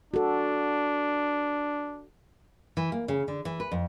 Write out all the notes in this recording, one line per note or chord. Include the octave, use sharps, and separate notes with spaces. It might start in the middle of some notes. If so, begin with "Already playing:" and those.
D4 F#4 A4
E3
A#3
C#3
D3
E3
B4
F2